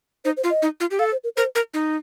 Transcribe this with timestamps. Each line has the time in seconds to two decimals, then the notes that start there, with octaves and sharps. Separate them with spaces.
0.25 D#4 C5
0.37 C5
0.44 F4
0.50 D#5
0.62 D#4
0.80 F4
0.91 G4
0.99 A4 F5
1.12 C5
1.24 A#4
1.36 A#4 C5
1.55 A#4
1.74 D#4